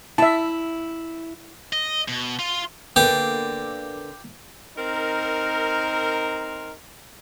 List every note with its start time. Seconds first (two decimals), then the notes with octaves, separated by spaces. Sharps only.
0.18 E4 E5 A5
1.73 D#5
2.08 B2
2.39 F4
2.96 D3 A#3 B3 G4
4.77 C4 D#4 A#4